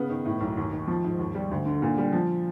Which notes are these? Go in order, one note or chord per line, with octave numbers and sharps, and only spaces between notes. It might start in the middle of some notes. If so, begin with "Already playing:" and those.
Already playing: C#3 B3
D#3
A2
B1
D#2
D#3
F3
G#2
D#2
G3
D2
D3
A#2
G3
F3